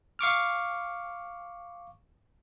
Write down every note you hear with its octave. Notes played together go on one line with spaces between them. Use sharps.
F5 C#6 D6 F6